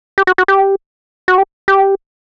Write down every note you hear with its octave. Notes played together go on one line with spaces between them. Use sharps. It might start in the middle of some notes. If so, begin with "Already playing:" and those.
G4
F#4
F#4
G4
F#4
G4
G4